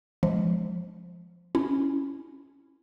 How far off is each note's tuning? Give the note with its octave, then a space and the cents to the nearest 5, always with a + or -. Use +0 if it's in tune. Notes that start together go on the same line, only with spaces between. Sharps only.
F3 +0 G#3 +0
C#4 +0 E4 +0